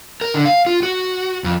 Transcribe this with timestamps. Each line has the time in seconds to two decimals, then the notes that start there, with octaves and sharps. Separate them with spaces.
0.21 A#4
0.34 D3
0.46 F5
0.66 F4
0.83 F#4
1.44 F2